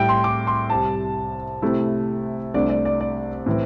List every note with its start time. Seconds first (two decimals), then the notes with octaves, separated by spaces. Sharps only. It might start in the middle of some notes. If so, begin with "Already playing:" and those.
Already playing: A2 G3 E4 G5
0.09 C6
0.24 D6
0.47 C6
0.70 C2 C3 G3 A5
1.62 C3 A3 E4
2.54 C2 C3 A3 D4 D5
2.70 D5
2.85 D5
3.01 D5
3.46 A2 E3 C4